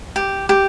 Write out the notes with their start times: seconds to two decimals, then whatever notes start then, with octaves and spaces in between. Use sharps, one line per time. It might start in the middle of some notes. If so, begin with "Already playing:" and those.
0.16 G4
0.49 G4